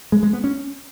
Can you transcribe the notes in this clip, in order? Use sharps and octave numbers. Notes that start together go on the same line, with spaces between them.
G#3
G#3
B3
C#4